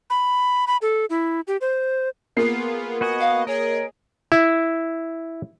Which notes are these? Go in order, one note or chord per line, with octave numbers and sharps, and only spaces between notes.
B5
B5
A4
E4
G4
C5
A#3 B3 F4 G#4 C7
B3 F#4 D#5 G#5
F5
G#4 A#4 C#5 D#5
E4